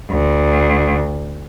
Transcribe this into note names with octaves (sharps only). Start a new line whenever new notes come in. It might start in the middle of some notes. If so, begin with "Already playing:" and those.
D2